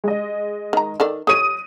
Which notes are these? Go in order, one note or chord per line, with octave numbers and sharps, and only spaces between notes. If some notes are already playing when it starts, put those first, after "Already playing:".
G#3 D#5
D#3 A#5
D#3 A4 D5
A4 C#5 D#6 D#7